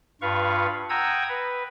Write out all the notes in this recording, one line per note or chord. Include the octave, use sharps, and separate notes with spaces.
G2 F4 B4 F5 C#6
F#5 G5 A#5 D#6 E6 G#6
B4